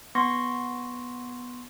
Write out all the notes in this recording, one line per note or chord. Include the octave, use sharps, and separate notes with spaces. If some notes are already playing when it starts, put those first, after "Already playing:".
B3 C6 C#6 A#6